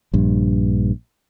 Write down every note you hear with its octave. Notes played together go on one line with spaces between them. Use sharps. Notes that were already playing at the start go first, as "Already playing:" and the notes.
A#1 G2